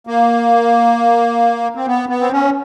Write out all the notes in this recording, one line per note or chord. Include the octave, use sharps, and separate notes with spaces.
A#3
C4
B3
B3
C4
C#4